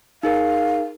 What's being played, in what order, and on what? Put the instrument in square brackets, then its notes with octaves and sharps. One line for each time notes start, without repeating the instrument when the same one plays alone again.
[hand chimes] D#4 G#4 A#4 [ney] F5